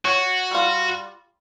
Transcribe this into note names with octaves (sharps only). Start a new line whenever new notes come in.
F#4 C#5
G3 F4